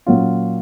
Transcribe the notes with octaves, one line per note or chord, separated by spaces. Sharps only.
A#2 F#3 C#4 F4